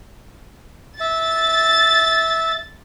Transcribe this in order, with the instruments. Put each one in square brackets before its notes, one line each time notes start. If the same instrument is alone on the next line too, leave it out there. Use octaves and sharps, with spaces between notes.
[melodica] E5 [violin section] A6